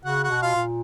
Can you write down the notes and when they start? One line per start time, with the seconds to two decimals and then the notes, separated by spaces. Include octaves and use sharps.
0.05 C#3 F#4 F#5
0.24 F#4 F#5
0.30 B2
0.42 F4 F5
0.55 A#2